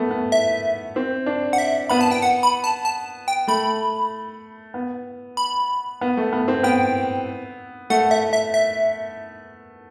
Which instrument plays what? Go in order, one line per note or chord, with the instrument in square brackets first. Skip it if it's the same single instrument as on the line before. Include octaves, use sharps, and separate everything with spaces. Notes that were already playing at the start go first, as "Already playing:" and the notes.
Already playing: [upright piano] A3 B3
B3
[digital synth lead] E5
[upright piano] C4
D4
[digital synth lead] F#5
E5
[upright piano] B3 [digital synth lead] B5
[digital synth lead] A5
G5
F#5
B5
A5
A5
G5
[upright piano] A3 [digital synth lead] B5
[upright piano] B3
[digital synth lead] B5
[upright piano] B3
A3
B3
C4
[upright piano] B3 [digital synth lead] G5
[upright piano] A3 [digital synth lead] F#5
[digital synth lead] E5
E5
E5